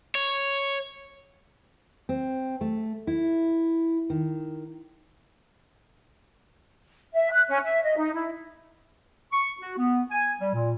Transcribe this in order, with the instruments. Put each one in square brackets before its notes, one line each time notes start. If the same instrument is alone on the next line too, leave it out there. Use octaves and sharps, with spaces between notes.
[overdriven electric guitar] C#5
[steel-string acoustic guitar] C4
A3
E4
D#3
[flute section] E5
F#6
C#4
E5
D#5
D#4
E4
[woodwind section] C#6
F#4
B3
G#5
G3
A#2